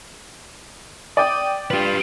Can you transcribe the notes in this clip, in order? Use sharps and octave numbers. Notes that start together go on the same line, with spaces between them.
D5 G5 D#6
F4 G4 B4